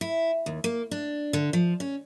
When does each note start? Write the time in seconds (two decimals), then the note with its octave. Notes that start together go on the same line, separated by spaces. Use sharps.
0.01 E4
0.46 D#2
0.64 A#3
0.91 D4
1.33 D3
1.53 F3
1.80 C#4